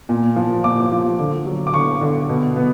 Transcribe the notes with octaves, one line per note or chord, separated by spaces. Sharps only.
A#2
F3
A#2 D6
F3
D3
F#3
D6
D3 C#6
D3
B2
B3